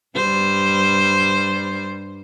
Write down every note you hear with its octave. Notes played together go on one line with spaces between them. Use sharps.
G2 G3 C5